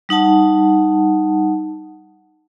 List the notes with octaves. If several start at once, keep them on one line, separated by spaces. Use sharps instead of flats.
G3 D#4 F#5 A5